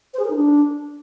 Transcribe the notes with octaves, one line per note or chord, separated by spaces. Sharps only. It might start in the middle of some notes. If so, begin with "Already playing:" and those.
C5
G#4
A#4
D#4
D4